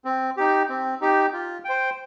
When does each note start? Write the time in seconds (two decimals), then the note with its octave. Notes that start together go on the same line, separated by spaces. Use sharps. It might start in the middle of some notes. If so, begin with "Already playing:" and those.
0.05 C4
0.37 D#4 G4
0.69 C4
1.01 D#4 G4
1.33 F4
1.65 C5 G5